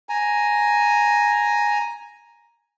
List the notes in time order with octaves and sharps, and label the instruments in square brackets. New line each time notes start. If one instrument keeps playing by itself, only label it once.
[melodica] G#5 A#5